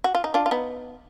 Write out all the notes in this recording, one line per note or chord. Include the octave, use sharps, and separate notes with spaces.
F#4
F4
D#4
D4 F4
F4
B3 D#4